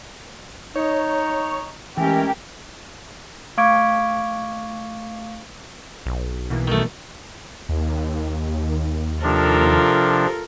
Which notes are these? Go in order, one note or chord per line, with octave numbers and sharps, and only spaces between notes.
D#4 C#5
E3 G#3 A3 C#4 G4 A#4
A3 F5 C#6 D6 G#6 D7
B1
B2 E3 A#3
D#3 A3
D#2
C3 F3 D4 F4 A4 A#4